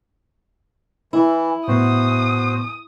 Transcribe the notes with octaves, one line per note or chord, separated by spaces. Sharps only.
E3 E4
A2 B3 F#4 C5 D#6